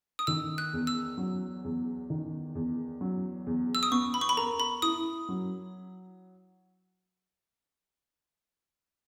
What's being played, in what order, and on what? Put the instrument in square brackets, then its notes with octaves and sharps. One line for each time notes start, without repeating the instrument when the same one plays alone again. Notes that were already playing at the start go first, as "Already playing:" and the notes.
[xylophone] D#6
[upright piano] D#3 [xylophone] E6
[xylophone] F#6
[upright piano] E2
[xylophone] E6
[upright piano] F#3
E2
D#3
E2
F#3
E2
[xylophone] E6
D#6
[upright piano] B3 [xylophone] C#6
[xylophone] B5
C#6
B5
[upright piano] A#4 [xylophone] A#5
[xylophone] B5
[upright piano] E4 [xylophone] D#6
[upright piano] F#3